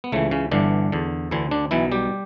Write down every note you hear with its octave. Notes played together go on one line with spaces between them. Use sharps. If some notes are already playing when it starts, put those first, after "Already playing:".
B3
C#2 C#3 E3 A3
C#3 C#4
G1 G2 D3 E3 D4
E2 D3
D2 D3 E3 E4
D3 D4
B1 B2 E3 E4
G3 G4